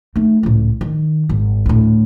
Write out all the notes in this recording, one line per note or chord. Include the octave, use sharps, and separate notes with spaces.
A3 D#4
C#2 A2
D#3
G#1
D2 A2